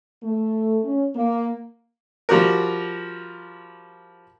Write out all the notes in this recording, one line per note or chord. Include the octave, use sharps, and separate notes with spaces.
A3
C#4
A#3
F3 G3 F#4 A#4